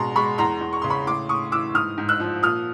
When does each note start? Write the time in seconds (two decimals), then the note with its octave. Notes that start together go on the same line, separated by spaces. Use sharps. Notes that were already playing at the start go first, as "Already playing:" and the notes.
Already playing: B2 G#3 A#5 C6
0.16 G#3 B5 C#6
0.38 E2 A#5 C6
0.61 E2
0.73 C#6
0.82 C#3 C6
0.90 B5 C#6
1.07 A2 C6 D6
1.29 A2 C#6 D#6
1.52 E3 D6 E6
1.74 G#2 D#6 F6
1.98 G#2
2.09 E6 F#6
2.20 F3
2.43 A#2 D#6 F6